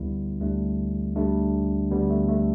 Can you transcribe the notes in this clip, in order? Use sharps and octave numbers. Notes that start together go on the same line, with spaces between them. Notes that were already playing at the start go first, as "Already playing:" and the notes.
Already playing: D2 D3 G3 B3 E4
D2 D3 G3 A3
D2 D3 G3 A3 D4
D2 D3 G3 B3
A3
A3